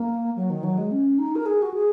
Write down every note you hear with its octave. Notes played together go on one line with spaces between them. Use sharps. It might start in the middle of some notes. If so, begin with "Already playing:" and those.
Already playing: A#3
F#3
D#3
F#3
G#3
C#4
D#4
A#4
G#4
F#4
G#4